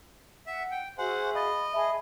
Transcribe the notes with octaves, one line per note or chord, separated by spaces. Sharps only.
E5 F#5
G5
F#4 G#4 C5 E5 F#5 G#5
D#5 F5 B5 A6
G#4 E5 A5 B5